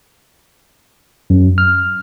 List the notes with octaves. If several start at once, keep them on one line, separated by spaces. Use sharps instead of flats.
F#2
F6